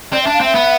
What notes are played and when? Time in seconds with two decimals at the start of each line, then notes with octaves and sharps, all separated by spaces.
0.13 C4 D5
0.23 E5
0.27 D4
0.34 F5
0.41 C4 E5
0.55 B3